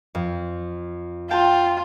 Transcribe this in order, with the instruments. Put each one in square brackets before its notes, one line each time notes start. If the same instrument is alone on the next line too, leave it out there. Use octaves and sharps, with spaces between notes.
[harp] F2
[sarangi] F4 [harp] G5 A5